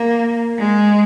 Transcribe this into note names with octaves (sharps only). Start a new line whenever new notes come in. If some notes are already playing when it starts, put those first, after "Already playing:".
Already playing: A#3
G#3